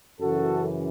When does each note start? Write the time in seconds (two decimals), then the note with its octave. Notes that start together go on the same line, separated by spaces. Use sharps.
0.21 F#2 C#3 E3 F#4 A4